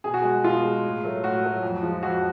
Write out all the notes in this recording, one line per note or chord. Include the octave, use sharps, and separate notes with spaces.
B2 G#4
F#4
G#3 G#4
B2 F4
G#3
A2
F#3 A3
A2 F#4
F#3 A3
F2
F3 G#3
F2 F#4